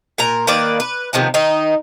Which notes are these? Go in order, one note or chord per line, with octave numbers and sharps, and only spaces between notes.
A#2 A#4 A#5
D#3 A#3 B4 D5
B4
C3 D#3 F3 B3
D#3 D#4